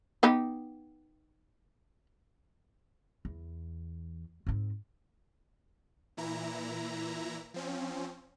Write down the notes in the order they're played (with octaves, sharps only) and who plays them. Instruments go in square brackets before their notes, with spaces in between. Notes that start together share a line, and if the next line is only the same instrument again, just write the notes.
[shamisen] B3 D#4 G4
[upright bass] E2
G#2 C4
[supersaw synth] A#2 E3 E4 A#5
F3 C4 C#4